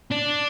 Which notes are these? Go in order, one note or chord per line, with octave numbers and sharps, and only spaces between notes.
D4